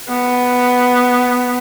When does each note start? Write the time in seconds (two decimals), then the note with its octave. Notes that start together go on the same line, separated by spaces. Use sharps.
0.09 B3